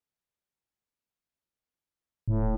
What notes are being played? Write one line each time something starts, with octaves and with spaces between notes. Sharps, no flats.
D#1 A2